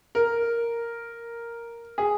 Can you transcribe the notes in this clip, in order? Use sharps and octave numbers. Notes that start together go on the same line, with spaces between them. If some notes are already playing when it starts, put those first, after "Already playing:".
A#4
G#4